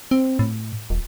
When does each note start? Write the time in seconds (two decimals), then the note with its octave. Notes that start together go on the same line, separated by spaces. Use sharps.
0.11 C4
0.39 A2
0.90 D#1